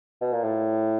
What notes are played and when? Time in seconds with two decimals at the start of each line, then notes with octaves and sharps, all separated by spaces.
0.21 B2
0.33 A#2
0.44 A2